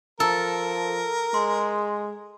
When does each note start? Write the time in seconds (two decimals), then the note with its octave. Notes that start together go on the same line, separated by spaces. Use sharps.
0.20 F3 A4 A#4
1.34 G#3 C6